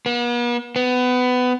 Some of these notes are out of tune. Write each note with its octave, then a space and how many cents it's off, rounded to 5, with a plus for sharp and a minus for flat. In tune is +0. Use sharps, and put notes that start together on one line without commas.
B3 -45
B3 +20